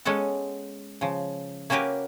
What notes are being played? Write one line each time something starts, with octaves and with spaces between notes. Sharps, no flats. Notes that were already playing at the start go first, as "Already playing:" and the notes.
G#3 B3 C#4 A4 F#5
C#3 F3
A#3 C#4 F#4 G4 A#4 B4